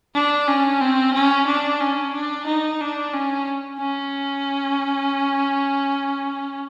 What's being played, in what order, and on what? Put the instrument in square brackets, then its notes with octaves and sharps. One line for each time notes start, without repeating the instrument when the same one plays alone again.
[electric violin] D4
C#4
C4
C#4
D4
C#4
D4
D#4
D4
C#4
C#4